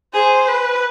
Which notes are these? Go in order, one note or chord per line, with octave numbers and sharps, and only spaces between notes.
G#4 C5
B4